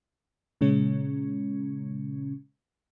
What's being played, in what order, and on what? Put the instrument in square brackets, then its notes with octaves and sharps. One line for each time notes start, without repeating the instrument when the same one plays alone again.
[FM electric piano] A#2 C#3 G#3 C#4